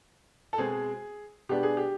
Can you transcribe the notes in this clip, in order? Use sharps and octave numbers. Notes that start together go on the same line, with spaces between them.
A4
B2 G#3 C4 G#4
B2 G#3 B3 D4 G4
G#4
G4